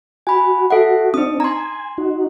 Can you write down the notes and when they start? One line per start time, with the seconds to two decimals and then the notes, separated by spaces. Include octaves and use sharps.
0.27 F#4 G#5 B5
0.70 A4 E5 F#5
1.14 C4 D4 D#4 D#6
1.40 G#5 A#5 C6
1.98 D#4 F#4